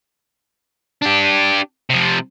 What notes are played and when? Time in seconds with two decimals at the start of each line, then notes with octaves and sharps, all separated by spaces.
1.02 D4 G4
1.90 C3 F3